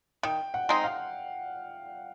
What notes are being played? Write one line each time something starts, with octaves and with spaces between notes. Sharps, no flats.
D#3 G5
F#5
G#3 C4 D#4
F5